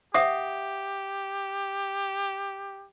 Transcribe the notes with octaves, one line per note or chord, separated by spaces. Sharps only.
G4 E5 F#5 D#6